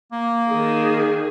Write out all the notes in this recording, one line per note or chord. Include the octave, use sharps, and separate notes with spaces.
A#3
D#3 G#4